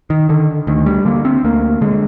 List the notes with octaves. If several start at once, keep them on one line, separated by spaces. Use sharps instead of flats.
D#3
D3 D#3
D2 D#3
G3
D3 A#3
C4
D2 A#3
D3 G#3